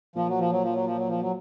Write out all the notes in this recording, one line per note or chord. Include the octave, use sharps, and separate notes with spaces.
A#2 F3
F#3
F3
F#3
F3
F#3
F3
F#3
F3
F#3